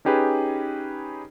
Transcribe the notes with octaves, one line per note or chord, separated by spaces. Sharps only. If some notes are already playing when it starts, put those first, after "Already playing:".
C#4 D#4 G4 G#4 B4